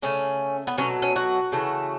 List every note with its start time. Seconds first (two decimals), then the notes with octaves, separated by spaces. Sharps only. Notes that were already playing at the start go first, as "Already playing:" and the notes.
0.02 C#3 A3 C#4
0.67 B3
0.78 B2 F#3 A3 C#4
1.02 C#4
1.16 F#4
1.52 C#3 E3 A3